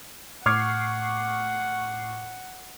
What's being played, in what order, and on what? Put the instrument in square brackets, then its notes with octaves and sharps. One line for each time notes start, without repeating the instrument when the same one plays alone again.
[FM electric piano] A2 C#6 C7 [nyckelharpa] F#5 [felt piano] D6 F6 G#6